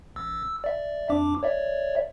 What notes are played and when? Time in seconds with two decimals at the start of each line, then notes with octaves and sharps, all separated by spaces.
0.16 A1 E6
0.44 E6
0.64 D5 E5
1.09 F2 D4 D6
1.43 C#5 D5 E5